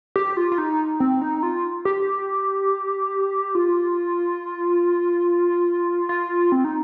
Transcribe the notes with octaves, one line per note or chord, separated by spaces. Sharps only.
G4
F4
F4
D#4
C4
D#4
F4
G4
F4
F4
C4
D#4